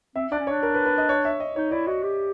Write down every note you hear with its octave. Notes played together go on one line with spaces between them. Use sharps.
C4 E5
D4 D5
C#4
D4 C#5
A#4
B4
B4
D#5
C#5
E5
D#5
D#4 C#5
E4 D5
F#4 D#5
G4